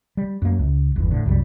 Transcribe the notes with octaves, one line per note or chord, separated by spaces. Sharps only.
G3
F#2 A#3
C#2
G1 E2
A2 D3
C2 F#2 C#3 G3